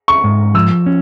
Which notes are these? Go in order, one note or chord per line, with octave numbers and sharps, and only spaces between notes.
C#6
G#2
F3 E6
C#4